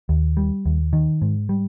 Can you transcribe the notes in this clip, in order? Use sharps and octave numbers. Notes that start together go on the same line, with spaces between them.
D#2
G3
D#2
D#3
G#2
G3